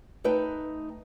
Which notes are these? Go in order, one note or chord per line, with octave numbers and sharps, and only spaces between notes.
A3 D#4 B4 G5